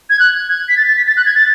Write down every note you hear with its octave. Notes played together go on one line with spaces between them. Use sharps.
G#6
F#6
G#6
B6
A6
A6
B6
A6
F#6
G#6
A6